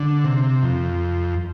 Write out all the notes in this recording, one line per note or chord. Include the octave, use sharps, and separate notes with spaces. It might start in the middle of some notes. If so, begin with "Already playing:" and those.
Already playing: D3
C3
F2